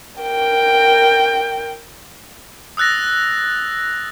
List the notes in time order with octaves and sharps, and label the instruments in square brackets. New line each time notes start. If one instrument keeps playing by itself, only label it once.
[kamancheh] A#4 G5
[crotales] D#6 E6 F#6 A6 A#6